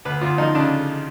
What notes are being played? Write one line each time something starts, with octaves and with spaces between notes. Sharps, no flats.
D2 B4
D2 F4
F3 D#4
C#3 D4